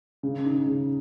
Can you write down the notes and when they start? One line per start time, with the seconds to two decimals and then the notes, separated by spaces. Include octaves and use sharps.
0.23 C#3
0.45 D#4
0.67 C#3